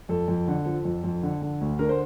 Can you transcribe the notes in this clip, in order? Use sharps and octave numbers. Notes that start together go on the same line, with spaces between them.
F2 A4
F2
D3
F3
F2
F2
D3
D3
D2
D3 A#4
C5